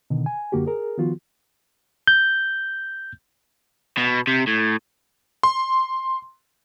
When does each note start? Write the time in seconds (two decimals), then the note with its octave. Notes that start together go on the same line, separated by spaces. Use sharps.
0.10 B2 D3 D#3
0.26 G#5
0.52 F#2 D3 A#3 F#4 G4
0.66 G#4 A#4
0.98 D#3 F3 B3 F4 F#4
2.07 G6
3.98 B2
4.27 C3
4.47 A2
5.43 C6